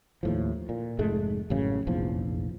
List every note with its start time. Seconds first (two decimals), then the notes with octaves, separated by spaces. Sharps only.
0.23 D#2 A2 F3
0.69 A#2
0.99 F1 G#2 G#3 A3
1.50 A1 F#2 C#3
1.87 F1 A#1 E2 F3